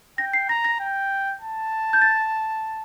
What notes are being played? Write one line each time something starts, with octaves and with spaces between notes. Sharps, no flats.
G5 A#6
C7
A#5 A#6
A#6
G5
A5
G6
A6